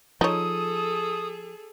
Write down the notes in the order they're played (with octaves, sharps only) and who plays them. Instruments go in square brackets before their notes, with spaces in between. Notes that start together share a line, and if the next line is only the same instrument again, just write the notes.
[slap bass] F3 [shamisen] D#4 C#5 [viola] G#4 A4 [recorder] D#6